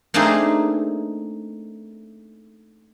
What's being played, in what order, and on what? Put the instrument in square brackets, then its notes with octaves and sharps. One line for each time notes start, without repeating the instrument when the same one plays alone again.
[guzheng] A3 A#3 C4 D4 D#4 G#4